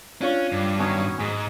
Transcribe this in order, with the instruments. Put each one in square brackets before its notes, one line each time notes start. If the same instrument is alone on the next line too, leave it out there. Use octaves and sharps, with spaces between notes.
[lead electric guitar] C#4 [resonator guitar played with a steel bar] D4 F4 C#5
[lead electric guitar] G2 [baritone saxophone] G3
[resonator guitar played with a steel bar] D#3 F#3 B3 [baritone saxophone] C#4
[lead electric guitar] G#2 [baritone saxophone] G#3